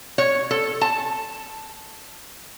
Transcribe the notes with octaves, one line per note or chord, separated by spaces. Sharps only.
C#5
A4
A5